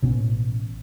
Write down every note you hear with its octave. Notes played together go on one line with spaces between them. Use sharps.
A1 B2 B3 C#4